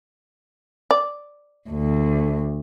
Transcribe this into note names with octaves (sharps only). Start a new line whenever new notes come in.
D5
D2